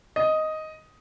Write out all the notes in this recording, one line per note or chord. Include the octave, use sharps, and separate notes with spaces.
D#5